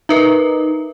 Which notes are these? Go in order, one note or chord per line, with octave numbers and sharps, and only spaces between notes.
D#4 A#4 B4 E5